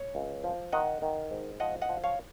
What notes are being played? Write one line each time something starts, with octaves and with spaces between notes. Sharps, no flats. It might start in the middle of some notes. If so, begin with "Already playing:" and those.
Already playing: C#5
C#2
F3
D#3 D#5 F#5
D#3
G#2
F3 D#5 F#5
D#5 F#5
F3
C#5 F5